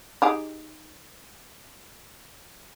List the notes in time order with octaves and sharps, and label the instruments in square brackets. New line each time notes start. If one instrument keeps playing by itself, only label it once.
[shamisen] D#4 G4 G#4